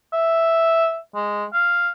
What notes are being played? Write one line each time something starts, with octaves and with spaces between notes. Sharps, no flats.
E5
G#3
F5